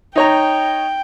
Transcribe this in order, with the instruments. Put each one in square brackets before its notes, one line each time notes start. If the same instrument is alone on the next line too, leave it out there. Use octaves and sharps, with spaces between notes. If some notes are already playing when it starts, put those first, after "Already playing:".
[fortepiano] D#4 C#5 A#5 [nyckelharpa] G5